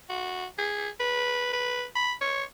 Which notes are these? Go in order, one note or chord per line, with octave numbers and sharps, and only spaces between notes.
F#4
G#4
B4
B4
B5
C#5